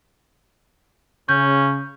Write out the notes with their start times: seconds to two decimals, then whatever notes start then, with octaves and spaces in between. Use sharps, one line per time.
1.29 C#3 C#4 G6